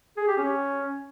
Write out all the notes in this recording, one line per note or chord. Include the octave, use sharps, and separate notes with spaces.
G#4
G4
C#4